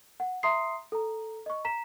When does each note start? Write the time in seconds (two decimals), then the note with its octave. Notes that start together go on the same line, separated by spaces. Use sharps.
0.20 F#5
0.43 E5 A#5 C6 D#6 C7
0.92 A4 A#5
1.46 D#5 C#6
1.65 A#5 B6 E7